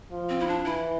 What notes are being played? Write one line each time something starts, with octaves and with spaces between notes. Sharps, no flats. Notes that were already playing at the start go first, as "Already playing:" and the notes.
F3
C4
E4
D4
E3 E4